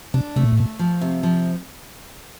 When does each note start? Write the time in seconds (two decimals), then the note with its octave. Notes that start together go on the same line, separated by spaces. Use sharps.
0.14 C3 D4
0.36 C3 A3
0.43 A#2
0.52 A2
0.57 A#2 A3
0.79 F3
1.01 C3
1.23 F3